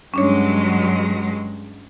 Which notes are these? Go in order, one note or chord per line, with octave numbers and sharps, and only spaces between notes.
G2 F#3 G#3 C#4 D4 C#5